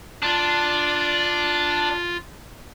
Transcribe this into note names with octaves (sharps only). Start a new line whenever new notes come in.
D4 F4